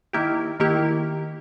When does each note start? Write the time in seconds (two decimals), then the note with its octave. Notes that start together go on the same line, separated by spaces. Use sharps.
0.13 D#3 A#3 E4 G4
0.60 D#3 A#3 E4 G4